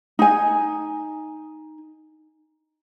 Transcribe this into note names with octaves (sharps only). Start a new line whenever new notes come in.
D#4 G#5